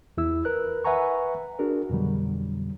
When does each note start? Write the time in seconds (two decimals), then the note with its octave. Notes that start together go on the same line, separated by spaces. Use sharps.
0.17 E2 E4 E6
0.45 A#4 B4 F#6
0.84 B4 E5 F#5 G#5 A#5 C#6
1.59 D4 F#4 G#4 A#4
1.90 F2 B2 D3 F#3 G3